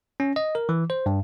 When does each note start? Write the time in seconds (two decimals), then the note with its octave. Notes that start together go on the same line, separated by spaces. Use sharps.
0.20 C#4
0.36 D#5
0.55 A#4
0.69 E3
0.90 C5
1.06 G2